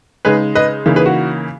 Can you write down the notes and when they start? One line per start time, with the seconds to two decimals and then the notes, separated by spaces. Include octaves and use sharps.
0.25 C#3 G#3 D#4 G#4 B4
0.55 B4 D#5
0.86 C#3 E3 A#3 D#4
0.96 G#4 B4
1.06 F#4